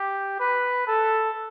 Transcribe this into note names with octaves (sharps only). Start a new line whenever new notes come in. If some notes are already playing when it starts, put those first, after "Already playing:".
Already playing: G4
B4
A4